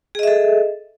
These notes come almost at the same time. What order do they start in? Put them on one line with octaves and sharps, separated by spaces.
G#4 D#5 E5 A4